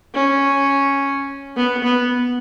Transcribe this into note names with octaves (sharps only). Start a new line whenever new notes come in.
C#4
B3
B3